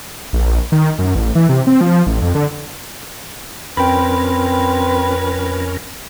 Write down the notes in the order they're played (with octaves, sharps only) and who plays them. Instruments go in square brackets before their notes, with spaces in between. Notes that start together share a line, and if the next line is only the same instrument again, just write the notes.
[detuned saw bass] A#1
D#3
F#2
A1
E3
C3
C4
F3
A1
F2
D3
[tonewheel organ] F2 C#4 A#4 [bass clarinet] C4 [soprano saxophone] B4 [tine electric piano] G5 B5